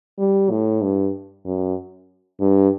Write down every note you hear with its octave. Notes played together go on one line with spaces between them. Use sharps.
G3
A2
G2
F#2
G2